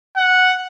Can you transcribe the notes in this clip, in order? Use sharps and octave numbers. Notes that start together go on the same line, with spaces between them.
F#5